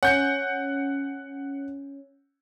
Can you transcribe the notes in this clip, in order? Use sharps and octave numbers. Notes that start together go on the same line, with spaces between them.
C#4 F#5 G6 C#7